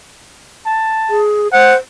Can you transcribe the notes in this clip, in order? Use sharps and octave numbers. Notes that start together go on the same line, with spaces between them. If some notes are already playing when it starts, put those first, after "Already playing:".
A5
G#4
C5 F#5